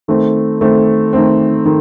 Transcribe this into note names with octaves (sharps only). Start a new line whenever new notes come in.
D#3 A3 C4
D#3 A3 C4
D#3 A3 C4
D#3